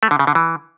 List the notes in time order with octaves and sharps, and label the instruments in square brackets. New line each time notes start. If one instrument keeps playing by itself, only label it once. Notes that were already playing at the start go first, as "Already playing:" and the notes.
[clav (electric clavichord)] A3
D3
C#3
D3
E3